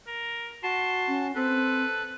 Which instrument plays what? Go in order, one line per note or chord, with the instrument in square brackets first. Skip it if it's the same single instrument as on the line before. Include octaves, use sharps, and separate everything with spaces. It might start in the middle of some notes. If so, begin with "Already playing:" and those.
[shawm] A#4
[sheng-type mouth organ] F#4 A5 [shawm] C6
[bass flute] C#4
[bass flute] C4 [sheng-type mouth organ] A4 [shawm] B4